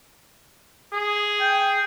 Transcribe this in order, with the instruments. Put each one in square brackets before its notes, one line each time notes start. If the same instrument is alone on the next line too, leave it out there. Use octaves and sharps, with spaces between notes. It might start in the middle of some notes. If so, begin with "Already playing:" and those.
[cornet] G#4
[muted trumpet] G5